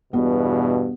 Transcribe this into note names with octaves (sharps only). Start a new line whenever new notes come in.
E2 G2 B2 B3